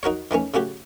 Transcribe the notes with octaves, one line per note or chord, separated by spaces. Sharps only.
D#4 F#4 A#4 C#5
D#3 E3 A3 C#4
C#3 A3 F#4 G4